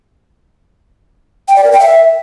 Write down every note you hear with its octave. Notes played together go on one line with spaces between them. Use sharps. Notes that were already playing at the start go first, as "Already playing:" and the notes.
G5
D5
A#4
G5
E5